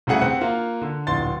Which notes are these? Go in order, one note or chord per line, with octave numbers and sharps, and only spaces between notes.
C2 C#3 A3 G#4 F#5 C#7
C3 C4 F#5 F#6
A#3 F4
D3
D1 A#1 C6 A6